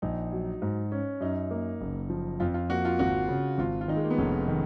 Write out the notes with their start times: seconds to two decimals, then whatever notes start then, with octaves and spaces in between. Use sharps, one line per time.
0.02 A#1 D#4
0.32 F#3
0.62 G#2
0.92 C#4
1.21 F#2 D#4
1.51 A#3
1.81 F#1
2.10 F3
2.40 F2 F4
2.54 F4
2.69 A#3 F#4
2.85 F4
2.99 G#1 F#4
3.28 C#3
3.58 G#1 F4
3.81 F4
3.88 D#3 D#4
3.96 G#3
4.04 A#3
4.10 B3
4.18 F1 C#4
4.48 D#3